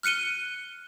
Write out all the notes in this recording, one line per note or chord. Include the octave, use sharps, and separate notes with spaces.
F6 F#6 C#7 D#7 G7